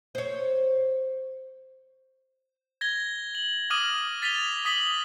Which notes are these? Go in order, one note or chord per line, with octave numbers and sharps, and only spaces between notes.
C5 C#5
G#6 A#6 G7
F#7
D6 D#6 F6 A#6 D#7 F#7
A6 B6 D#7 F7 G7
D#6 B6 F#7 G7